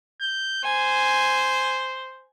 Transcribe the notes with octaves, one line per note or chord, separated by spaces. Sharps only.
G6
C5 G#5